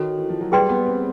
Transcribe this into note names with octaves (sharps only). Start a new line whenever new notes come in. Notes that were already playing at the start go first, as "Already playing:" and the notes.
Already playing: D#3 F#4 A4 C#5
E3
F3
F#3
G3 G#4 B4 D5 G5 C6
B3
C4